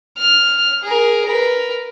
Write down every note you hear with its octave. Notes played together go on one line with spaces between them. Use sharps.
F6
G#4 A#4
A#4 B4